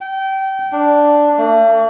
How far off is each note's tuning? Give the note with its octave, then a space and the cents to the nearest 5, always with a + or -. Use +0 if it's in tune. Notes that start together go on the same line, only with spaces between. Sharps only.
G5 -25
D4 +0
A3 +45